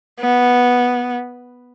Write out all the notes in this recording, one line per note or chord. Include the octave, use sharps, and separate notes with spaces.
B3